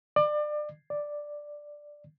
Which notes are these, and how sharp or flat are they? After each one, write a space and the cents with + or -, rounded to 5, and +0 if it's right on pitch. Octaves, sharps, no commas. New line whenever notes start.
D5 +30
D5 +5